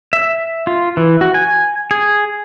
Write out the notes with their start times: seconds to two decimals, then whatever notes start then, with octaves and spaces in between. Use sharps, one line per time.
0.13 E5
0.67 F4
0.97 E3
1.21 F#4
1.34 G#5
1.91 G#4